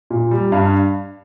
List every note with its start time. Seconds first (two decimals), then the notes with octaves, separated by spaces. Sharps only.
0.10 A#2
0.31 G3
0.52 G2 F5